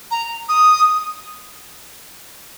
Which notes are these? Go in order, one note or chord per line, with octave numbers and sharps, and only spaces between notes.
A#5
D#6